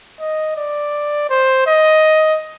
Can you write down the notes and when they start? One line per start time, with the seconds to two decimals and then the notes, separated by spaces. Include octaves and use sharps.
0.20 D#5
0.56 D5
1.30 C5
1.67 D#5